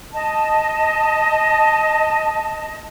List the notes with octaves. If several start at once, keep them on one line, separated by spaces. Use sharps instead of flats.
D#5 A5